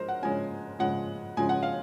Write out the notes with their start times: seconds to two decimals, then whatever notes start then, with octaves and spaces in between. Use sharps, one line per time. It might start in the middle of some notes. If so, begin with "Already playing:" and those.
Already playing: F3 G#3 A#4 C5
0.09 F#5
0.22 C#3 F3 G#3 C#4 G#5
0.79 C#3 F3 G#3 C#4 F#5
1.37 C#3 F3 G#3 C#4 G#5
1.49 F#5
1.63 F5